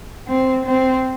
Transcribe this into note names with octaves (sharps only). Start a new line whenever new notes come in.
C4
C4